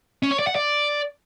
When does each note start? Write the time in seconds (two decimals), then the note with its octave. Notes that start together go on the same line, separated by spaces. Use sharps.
0.23 C#4
0.31 C#5
0.39 D5
0.47 F#5
0.55 D5